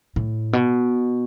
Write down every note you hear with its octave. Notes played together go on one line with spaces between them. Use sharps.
A2
B2